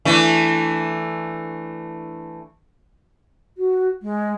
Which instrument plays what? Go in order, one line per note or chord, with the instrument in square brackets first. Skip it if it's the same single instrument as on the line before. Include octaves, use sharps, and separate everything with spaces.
[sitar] E3 A3 D4
[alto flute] F#4
G#3